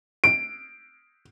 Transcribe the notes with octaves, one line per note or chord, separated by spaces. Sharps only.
D7